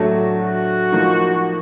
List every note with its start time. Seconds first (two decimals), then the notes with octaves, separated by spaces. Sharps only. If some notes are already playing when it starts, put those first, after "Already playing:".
Already playing: A2 F#3 A3 D4 F#4
0.40 F#4
0.92 F3 A#3 D#4